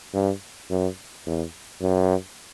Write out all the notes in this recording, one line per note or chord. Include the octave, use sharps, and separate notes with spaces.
G2
F#2
E2
F#2